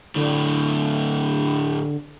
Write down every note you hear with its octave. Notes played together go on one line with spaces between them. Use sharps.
D2 A2 D3